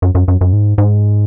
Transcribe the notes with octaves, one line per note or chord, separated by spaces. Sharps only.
F#2
F#2
F#2
F#2
G#2
G#2